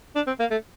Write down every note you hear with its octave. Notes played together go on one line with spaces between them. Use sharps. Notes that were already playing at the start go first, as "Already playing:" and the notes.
D4
C4
A#3
A3